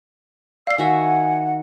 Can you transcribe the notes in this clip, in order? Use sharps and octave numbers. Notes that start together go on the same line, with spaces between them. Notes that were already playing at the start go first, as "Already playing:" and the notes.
D5 F5 E6 C7
D#3 F#4 E5 F#5 G#5